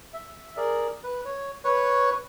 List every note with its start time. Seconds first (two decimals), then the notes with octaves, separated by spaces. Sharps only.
0.14 E5
0.57 G#4 A#4 D5
1.04 B4
1.25 C#5
1.65 B4 C#5 C#6